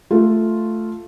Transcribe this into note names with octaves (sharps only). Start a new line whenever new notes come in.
A3 F4